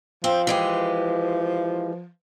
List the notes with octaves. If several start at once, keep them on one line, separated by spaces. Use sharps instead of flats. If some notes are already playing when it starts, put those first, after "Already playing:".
F3 C4
E3 G#3 G4